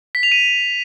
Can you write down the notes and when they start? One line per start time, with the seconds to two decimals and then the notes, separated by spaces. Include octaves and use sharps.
0.15 B6
0.23 F7
0.32 D#7